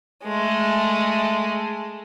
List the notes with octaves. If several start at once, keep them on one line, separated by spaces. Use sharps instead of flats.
G#3 A3